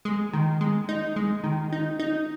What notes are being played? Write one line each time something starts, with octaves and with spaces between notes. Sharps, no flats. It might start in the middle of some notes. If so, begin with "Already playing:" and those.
G#3
D#3
G#3
D#4
G#3
D#3
D#4
D#4